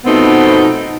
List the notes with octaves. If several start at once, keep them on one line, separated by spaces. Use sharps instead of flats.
B2 F3 A3 B3 C4 D#4